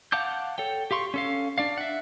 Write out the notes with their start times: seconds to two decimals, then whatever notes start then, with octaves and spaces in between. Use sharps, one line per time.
0.12 F5 F#5 A5 D6 G6
0.58 A4 C#5 G5
0.91 G4 F5 C6 C#6
1.14 C#4 A4 F5
1.58 D4 D5 F5
1.78 E5 F#5